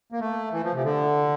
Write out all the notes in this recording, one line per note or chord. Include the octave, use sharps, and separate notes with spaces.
A#3
A3
E3
F3
C3
D3